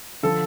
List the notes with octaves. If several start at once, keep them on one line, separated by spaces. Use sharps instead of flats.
D3 F3 A4